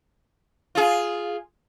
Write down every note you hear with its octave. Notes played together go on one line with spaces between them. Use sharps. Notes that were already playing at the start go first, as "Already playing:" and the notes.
F4 G#4